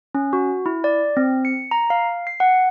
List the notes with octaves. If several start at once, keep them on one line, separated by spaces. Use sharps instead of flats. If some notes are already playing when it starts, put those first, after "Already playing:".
C#4
F#4
E4
D5
C4
C#7
A#5
F5
C7
F#5